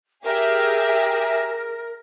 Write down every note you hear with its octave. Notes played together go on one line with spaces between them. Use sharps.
G4 G#4 A#4 E5